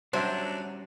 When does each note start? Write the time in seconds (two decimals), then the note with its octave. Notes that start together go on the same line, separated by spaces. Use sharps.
0.13 F#3 G3 C#4 D4 F#4 C5 E5